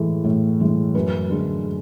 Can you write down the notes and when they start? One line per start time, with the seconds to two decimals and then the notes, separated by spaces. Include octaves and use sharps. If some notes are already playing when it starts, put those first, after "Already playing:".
Already playing: A2 E3 G#3 A4
0.24 A2
0.60 E3 G#3
0.95 F#2 B4
1.30 D3 G#3